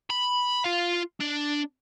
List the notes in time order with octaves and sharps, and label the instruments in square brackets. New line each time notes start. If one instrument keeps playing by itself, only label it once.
[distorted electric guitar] B5
F4 F5
D4